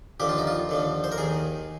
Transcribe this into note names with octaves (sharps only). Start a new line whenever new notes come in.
D#2 D3 F3 G4
F4
D#4
F4
D#2 D3 F3
C5
A#4
D#2 D#3 G#4